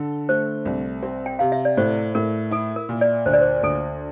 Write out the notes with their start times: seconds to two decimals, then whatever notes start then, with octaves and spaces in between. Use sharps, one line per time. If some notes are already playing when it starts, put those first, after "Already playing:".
Already playing: D3 A4
0.29 A3 C5
0.65 C2
1.03 C4
1.26 G5
1.39 C3 F5
1.52 E5
1.65 D5
1.77 A2 C5
2.15 A2 A#4
2.51 E4 A4
2.76 A#4
2.89 A#2
3.01 D5
3.26 D2 C5
3.34 D5
3.41 C5
3.63 D2 A4